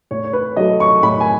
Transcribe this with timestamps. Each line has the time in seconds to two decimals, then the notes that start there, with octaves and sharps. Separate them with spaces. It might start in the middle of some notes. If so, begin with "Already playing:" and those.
0.11 A2 C#5
0.24 C#5
0.33 B4
0.56 F#3 A3 D#5
0.80 C#6
1.03 A2 B5
1.20 G#5